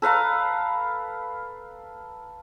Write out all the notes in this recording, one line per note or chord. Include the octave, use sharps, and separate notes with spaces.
A4 B4 F5 A#5